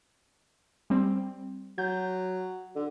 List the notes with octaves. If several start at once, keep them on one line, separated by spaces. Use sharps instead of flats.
G3 C4
F#3 G6
D3